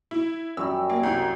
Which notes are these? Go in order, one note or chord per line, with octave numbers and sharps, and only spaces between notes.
E4
F#2 G3 G4 E6
A#3
C2